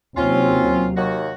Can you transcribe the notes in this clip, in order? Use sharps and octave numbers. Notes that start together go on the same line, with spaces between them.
D#2 C3 F#3 C4 C#4 F4
D#2 F#4